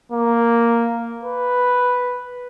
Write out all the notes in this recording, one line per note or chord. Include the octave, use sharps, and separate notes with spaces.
A#3
B4